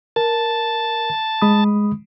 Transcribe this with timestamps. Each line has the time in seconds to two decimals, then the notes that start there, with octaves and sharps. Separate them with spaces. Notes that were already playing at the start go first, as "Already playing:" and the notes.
0.16 A#4 A5
1.42 G#3 B5 D#6